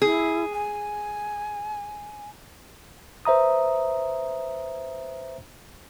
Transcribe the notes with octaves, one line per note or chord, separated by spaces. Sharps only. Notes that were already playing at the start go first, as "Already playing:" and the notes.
E4 G#4
G#5
B4 C5 E5 A#5 D#6